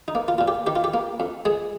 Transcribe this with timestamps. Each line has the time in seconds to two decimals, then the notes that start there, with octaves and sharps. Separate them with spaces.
0.08 D#4
0.15 A#3
0.28 F4
0.38 A#2 F4
0.48 G4
0.67 D#3 G4
0.76 F4
0.84 G4
0.94 A#3
1.20 F2
1.45 G#3 G#4